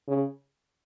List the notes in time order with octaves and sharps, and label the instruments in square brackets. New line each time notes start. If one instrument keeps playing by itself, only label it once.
[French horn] C#3